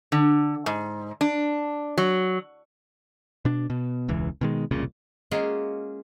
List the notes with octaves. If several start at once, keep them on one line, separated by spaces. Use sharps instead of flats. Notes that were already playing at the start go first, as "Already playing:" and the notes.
D3
G#2
D4
F#3
B2 D4
B2
E1 C#2 E3
B2 D#3 G#3
E1 C2 A#2 C#3
G#3 A#3 C#4 F4 F#4